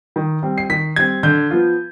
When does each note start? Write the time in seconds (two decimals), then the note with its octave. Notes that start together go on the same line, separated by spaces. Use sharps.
0.16 D#3
0.43 G3 C4
0.58 C7
0.70 D#3 B6
0.96 G3 C4 G#6
1.23 D3 G6
1.50 F3 B3 F4